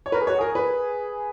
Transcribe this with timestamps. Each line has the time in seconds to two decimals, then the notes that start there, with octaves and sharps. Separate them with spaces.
0.06 C#5
0.12 A#4 B4
0.22 G#4
0.27 F#4 C#5
0.39 G#4 A#4
0.55 B4